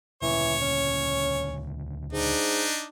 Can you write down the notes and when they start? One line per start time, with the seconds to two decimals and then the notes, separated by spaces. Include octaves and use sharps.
0.22 D2 A#2 C#3 E3 C#5
0.61 C#4
2.13 G#2 D4 D#4